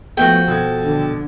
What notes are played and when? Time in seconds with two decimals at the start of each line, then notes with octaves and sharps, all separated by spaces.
0.17 F3 A3 B3 F#4 G5
0.48 B2 A4 G#6
0.84 D3